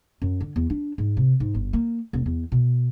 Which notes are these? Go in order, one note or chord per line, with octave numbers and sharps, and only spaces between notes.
F#2
D3
E2
D4
G#2
C3
G#2
G1
A#3
E1
E2
B2